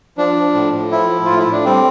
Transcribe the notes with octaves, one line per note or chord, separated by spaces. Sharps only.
F3 D4
F3
A2
A2
F3 E4
F3
A2 F4
E4
A2 D4
G3 C4